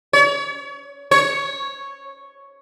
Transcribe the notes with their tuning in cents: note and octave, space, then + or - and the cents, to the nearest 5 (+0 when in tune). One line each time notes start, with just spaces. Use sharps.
C#5 +30
C#5 -5